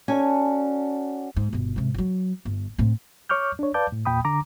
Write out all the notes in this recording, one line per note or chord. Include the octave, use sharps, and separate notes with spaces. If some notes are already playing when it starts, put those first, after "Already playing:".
C#4 F#4 A4 D5 G#5
G#2
G1 B2
G#2 C3
F3 F#3
G1
A2 C4
C#5 C#6 D6 F6 G6
D4 C#5
B4 D5 F5 A5 D6 G6
A2
E2 A#2 G5 B5 D#6
D3 A#5 D6